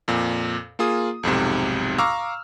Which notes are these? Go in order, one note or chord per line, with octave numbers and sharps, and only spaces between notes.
F2 A#2
A#3 F4 G#4 D#6
B1 F2 G#2 C3
F5 A#5 C#6 D6 E6 F6